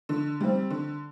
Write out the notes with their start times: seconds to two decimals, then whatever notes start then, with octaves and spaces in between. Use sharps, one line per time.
0.09 D3
0.40 G3 C4
0.70 D3